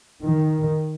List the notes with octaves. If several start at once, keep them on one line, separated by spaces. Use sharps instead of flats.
D#3